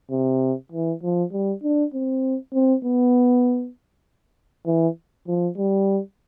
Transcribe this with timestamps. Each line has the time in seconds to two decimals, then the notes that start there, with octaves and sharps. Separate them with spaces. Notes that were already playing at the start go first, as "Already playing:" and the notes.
0.11 C3
0.72 E3
1.03 F3
1.32 G3
1.63 D4
1.94 C4
2.54 C4
2.84 B3
4.66 E3
5.27 F3
5.57 G3